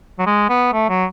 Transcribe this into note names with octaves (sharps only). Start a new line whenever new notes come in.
F#3
G#3
B3
A3
F#3